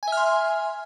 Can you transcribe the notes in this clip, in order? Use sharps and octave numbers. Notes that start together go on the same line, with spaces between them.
E5 G#5 C6 F6